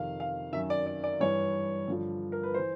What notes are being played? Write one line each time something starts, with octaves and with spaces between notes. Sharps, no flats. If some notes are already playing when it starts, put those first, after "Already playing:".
Already playing: F2 C3 D#3 F5
F5
F#2 D#3 E5
D5
D5
D5
G2 E3 C#5
G2 D3 F3
A#4
B4
E3 C5